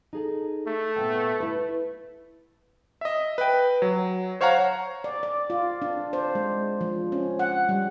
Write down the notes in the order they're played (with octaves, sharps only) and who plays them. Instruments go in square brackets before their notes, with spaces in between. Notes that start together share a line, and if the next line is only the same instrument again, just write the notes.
[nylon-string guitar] D#4 G#4 A4
[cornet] A3
[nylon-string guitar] A#2 B3 G5
E4 B4
[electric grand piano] D#5 E5
B4 G5
F#3
C5 C#5 F5 F#5 A#5
[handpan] D5
D5
F4
D4
C5
G#3
F3
C#4
F#5
G3